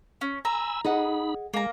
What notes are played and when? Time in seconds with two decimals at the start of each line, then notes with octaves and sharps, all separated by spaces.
0.21 C#4
0.45 G#5 A#5 B5 E6
0.85 D#4 G#4 D#5 F#5 B5
1.54 G#3 A#3 A#5